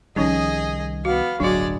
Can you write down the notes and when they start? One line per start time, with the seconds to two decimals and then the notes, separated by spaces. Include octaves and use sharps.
0.16 C2 D#3 F3 G3 C#4 D#4 G#4 D#5
1.05 B3 F#4 F5
1.40 D1 G1 F#3 G#3 D4 F#4 D5